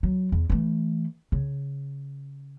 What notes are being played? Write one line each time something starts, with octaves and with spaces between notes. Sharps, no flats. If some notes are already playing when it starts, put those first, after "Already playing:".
F#3
E2
E3 A3
C#3